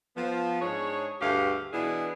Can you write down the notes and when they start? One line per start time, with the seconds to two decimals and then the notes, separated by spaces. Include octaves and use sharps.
0.16 F3 B3
0.61 G#2 D4 G#4 C#5
1.20 D2 G2 A3 G4 G#4 F5
1.73 B2 E3 B3 D4 E4 G#4